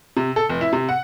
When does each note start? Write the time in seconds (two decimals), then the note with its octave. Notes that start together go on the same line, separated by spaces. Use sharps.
0.17 C3
0.36 A4
0.49 F1
0.61 E4
0.73 C3
0.89 F#5